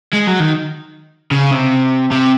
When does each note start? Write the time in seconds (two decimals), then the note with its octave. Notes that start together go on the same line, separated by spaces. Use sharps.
0.13 G#3
0.27 F#3
0.40 D#3
1.32 C#3
1.52 C3
2.11 C3